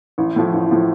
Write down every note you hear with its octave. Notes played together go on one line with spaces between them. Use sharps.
A1
A2 F3
A1
A2 F3